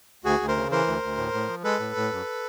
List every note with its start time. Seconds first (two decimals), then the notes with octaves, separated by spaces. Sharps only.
0.24 D2 F#4 G#4
0.40 D2
0.48 A#4 C5
0.57 C#3
0.71 E3 A#4 C5
0.87 D2
1.03 D2
1.17 A2
1.33 A2
1.48 F3
1.64 G#3 A4 B4
1.79 A2
1.96 A2
2.12 F#2